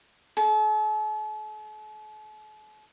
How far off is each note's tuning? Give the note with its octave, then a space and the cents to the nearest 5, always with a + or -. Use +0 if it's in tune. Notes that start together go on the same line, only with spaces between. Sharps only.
A4 -45